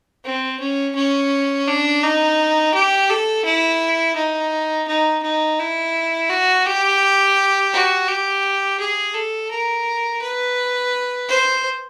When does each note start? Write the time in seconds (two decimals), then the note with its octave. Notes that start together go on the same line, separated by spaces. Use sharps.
0.25 C4
0.60 C#4
0.95 C#4
1.68 D4
2.03 D#4
2.74 G4
3.10 A4
3.45 E4
4.16 D#4
4.88 D#4
5.23 D#4
5.59 E4
6.30 F#4
6.66 G4
7.73 F#4
8.08 G4
8.80 G#4
9.14 A4
9.51 A#4
10.22 B4
11.29 C5